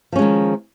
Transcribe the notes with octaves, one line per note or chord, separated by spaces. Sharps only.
D#3 F3 G#3 C#4